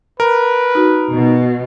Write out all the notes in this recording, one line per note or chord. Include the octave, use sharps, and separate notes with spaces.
A#4 B4
D#4 F#4
B2